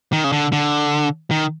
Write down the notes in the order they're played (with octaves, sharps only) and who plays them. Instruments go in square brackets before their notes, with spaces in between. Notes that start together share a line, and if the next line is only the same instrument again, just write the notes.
[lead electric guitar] D#3
C#3
D3
D3
D#3